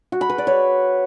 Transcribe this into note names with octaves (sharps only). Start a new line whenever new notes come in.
F#4
B5
B4
D5
C#5